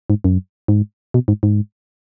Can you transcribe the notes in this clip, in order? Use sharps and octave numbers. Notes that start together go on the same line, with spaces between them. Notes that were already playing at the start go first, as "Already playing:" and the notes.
G#2
F#2
G#2
B2
G#2
G#2